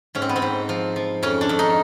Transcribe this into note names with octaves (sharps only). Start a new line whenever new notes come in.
G#2 C#4
C4
B3
C4
G#2
F3
F3
F2 C#4
D4
F2
D#4